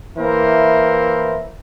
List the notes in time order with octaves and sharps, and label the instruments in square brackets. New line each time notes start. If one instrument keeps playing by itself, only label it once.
[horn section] E3 A#3 E4 A#4 C5